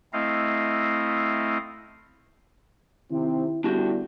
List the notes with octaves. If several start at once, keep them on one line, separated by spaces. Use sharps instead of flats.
A3 C4 E4 D#5 F5
C3 D#3 C4 E4
D3 G3 B3 D4 E4 F#4 G4